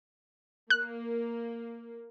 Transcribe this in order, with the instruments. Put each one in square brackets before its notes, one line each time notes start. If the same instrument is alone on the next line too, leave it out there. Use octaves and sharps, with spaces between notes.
[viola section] A#3 [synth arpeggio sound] F#6